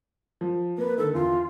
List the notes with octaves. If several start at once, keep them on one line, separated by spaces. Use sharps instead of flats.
F3
A#3 B4
D3 D#3 A4
E2 F4